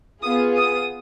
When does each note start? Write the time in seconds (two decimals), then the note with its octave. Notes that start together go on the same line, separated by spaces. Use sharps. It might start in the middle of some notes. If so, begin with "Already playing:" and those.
0.22 B3 F4 G#4 D#6
0.56 D#6